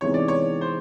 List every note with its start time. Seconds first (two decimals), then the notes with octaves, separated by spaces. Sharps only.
0.01 C3 E3 G#3 B3 D#4 C#5
0.14 D5
0.28 C#5
0.61 C5